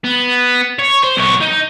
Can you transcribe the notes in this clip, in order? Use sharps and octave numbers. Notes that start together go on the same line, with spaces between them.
B3
C#5
C5
B1 C#5
D#4